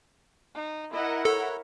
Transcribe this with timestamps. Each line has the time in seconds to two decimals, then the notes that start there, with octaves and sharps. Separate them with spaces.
0.55 D#4
0.93 E4 A#4 D#5 F#5
1.25 A4 C#5